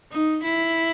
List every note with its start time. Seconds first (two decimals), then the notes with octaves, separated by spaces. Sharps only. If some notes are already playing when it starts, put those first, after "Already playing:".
0.12 D#4
0.44 E4